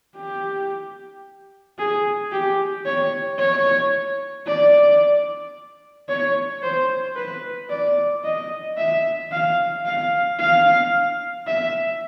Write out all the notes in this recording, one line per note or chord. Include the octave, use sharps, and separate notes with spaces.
G4
G#4
G4
C#5
C#5
D5
C#5
C5
B4
D5
D#5
E5
F5
F5
F5
E5